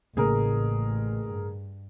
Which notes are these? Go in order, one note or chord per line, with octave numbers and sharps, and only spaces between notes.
A1 A2 C#3 A#3 G#4 A#4
G2